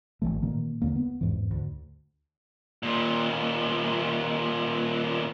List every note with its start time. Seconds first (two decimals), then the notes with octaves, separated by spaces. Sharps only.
0.22 G#1 C#2 E3 A3
0.42 A#2 D#3 A#3
0.82 D#2 D3 A#3
0.96 B3
1.21 E2 G#2 E3
1.51 D2
2.83 D#2 A#2